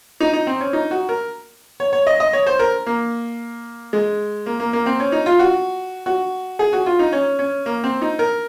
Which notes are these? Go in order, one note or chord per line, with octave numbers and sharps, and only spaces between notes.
D#4
D#4
C4
C#4
D#4
F#4
A#4
C#5
C#5
D#5
D#5
C#5
C5
A#4
A#3
G#3
A#3
A#3
A#3
C4
C#4
D#4
F4
F#4
F#4
G#4
F#4
F4
D#4
C#4
C#4
A#3
C4
D#4
A#4